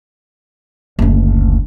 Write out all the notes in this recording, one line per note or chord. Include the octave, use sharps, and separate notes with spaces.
F#1 D2